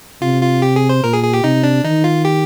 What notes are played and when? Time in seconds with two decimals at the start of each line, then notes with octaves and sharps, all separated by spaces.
0.22 C3 F4
0.42 F4
0.62 G4
0.76 G#4
0.89 C5
1.04 A#2 A#4
1.13 G#4
1.23 G#4
1.34 G4
1.43 C3 D#4
1.64 D4
1.84 D#3 D#4
2.04 F4
2.25 G4